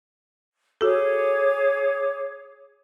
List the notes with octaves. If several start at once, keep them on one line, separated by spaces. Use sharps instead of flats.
F#4 G#4 A4 C#5 D6